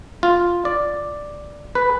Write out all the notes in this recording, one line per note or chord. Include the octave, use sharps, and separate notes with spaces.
F4
D5
B4